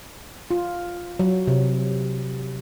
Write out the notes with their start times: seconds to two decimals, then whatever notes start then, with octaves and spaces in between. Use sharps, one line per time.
0.51 F4
1.20 F#3
1.47 C3